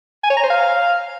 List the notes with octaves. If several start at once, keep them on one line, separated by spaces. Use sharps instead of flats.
G#5
C#5
A#5
C5
F5